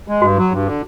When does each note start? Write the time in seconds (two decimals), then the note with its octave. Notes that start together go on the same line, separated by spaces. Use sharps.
0.08 G#3
0.22 G2 F#4
0.37 F#3
0.52 G2
0.66 D3